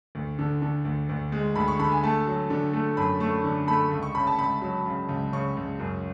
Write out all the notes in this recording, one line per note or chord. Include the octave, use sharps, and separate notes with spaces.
D2
D3
D3
D2
D2
G#3
D2 B5
C#6
D3 B5
G#5
A3 A5
F#3
D3
A3
F#2 B5
A3 C#6
D3
A3 B5
C#2
C#6
C#3 B5
A5
C#2 B5
F#3
C#3
C#2
C#3 C#6
C#2
F#2